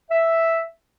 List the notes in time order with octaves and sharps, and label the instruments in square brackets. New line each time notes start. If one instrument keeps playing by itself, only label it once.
[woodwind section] E5